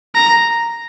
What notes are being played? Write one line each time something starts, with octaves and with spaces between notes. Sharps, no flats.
A#5